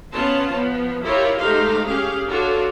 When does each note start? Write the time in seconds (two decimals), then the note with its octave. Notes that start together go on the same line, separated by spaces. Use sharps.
0.11 B3 C#4 F4 C#5 A5 C6
0.51 F3 B3
1.02 E4 F4 G4 A#4 C#5
1.39 G#3 A3 D#4 G4 C5 F5
1.86 C#4 G4 G#4 F5
2.27 D4 F4 F#4 A4 C#5